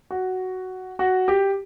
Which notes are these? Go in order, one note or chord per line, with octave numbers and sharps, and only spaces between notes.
F#4
F#4
G4